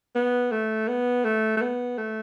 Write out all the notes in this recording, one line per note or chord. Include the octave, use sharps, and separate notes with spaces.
B3
A3
B3
A3
A3
B3
A3